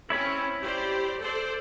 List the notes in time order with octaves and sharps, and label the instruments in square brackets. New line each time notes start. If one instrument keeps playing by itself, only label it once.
[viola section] C4 C#4 [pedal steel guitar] E4 C#5 B5
[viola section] G4 C5 D5
A4 C5 D5